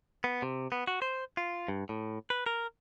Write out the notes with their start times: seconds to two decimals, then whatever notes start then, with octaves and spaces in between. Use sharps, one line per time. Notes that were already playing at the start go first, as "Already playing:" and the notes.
0.24 B3
0.42 C3
0.72 B3
0.87 F#4
1.02 C5
1.37 F4
1.68 G2
1.89 A2
2.30 B4
2.46 A#4